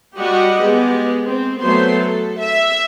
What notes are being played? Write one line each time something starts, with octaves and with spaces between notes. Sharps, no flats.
G3 F#4 G4 D#5 F#5
G#3 B3 G4
C4
F#3 A3 B3 C5 C6
A4
E5